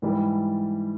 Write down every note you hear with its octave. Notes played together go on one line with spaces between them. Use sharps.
G#2 E3 G3